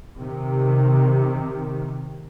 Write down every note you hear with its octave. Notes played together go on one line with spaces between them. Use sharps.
C3 D#3